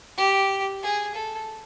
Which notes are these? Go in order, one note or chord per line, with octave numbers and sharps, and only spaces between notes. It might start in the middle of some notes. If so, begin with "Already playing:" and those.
G4
G#4
A4